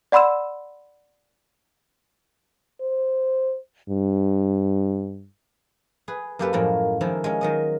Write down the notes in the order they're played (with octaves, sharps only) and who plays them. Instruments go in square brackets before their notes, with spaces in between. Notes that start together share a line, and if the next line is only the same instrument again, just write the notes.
[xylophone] D5 F#5 B5 C6 E6 E7
[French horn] C5
G2
[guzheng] G#4 B4
F#2 A#3 G4 A4 B4
F#2 A2 F3 G#3 A#3 F#4
D#3 F3 G#3 A#3 E4
G#3 C#4
D#3 F#3 D#5